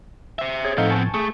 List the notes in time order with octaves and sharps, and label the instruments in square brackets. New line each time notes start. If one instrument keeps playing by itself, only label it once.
[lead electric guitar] C5 E5
[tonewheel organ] G#4 C#5
[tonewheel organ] A2 F3 [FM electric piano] A3 D#4 F5 [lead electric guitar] B3 C4
[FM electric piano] G#5 A5 C#6
[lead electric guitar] A3 [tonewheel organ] G#4